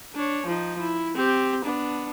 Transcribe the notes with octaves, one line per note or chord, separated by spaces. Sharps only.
D4 C#5
F3 D#4
E4
C4 G4
B3 D4